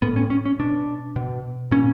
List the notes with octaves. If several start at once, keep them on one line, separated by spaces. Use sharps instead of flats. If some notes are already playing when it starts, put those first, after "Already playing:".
A2 B3
C#4
C#4
C#4
B2 D4
B2
A#2 C#4